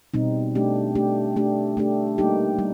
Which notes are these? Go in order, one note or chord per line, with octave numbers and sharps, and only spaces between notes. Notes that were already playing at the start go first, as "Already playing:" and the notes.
B2 G3 C4 D#4
A3 D4 G4
A3 D4 G4
A3 D4 G4
A3 D4 G4
G3 A#3 D#4 G4
G3